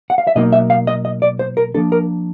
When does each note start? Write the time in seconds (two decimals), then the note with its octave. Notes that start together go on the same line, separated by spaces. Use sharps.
0.10 F#5
0.18 F5
0.27 E5
0.35 B2 F#3 A#3 D#4 D#5
0.52 E5
0.70 F5
0.87 D#5
1.05 D#5
1.22 D5
1.39 C5
1.57 A#4
1.74 F3 A#3 D4 A4
1.92 A#4